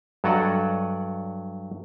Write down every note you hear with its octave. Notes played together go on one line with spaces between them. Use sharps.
G2 F#3 A4 D5 D#5 F#5